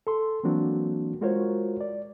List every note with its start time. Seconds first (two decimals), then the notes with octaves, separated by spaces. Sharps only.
0.07 A4 C6
0.44 E3 F#3 A#3 C4 D4 F#4
1.21 G#3 F4 F#4 A#4 C5 C#5
1.81 D5